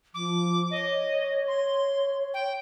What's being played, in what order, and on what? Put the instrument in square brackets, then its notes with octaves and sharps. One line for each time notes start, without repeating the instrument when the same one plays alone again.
[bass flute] F3 [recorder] D6
[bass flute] C#5 [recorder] D#5
[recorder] C6
G5